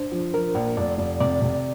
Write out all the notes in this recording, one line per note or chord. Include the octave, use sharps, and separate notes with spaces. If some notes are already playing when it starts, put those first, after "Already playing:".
Already playing: D4 C5
F3
F3 A#4
A#1
F1 D5
F1
C3 D5
C3